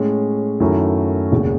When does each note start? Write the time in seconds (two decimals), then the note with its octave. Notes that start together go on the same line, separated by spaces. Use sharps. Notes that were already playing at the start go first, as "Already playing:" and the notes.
Already playing: A2 G#3 C#4 G#4
0.60 F#2 D#3 F#3 A3 E4
1.32 E1 D#2 C#3